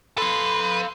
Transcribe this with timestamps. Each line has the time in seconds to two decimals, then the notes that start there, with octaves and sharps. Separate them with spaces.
0.18 A4 B4 F5 C6